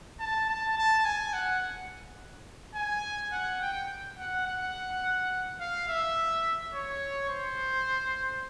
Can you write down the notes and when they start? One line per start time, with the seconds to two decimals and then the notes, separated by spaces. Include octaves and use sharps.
0.20 A5
0.49 A5
0.78 A5
1.05 G#5
1.34 F#5
2.75 G#5
3.32 F#5
3.62 G5
4.18 F#5
4.46 F#5
5.60 F5
5.89 E5
6.74 C#5
7.30 C5